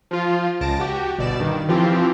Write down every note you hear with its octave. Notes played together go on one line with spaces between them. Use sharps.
F3 F4
C#2 A5 A#6 D7
F#4 G4
G1 B2 D5 E7
G2 D#3
E3 F3 C4 F4 G4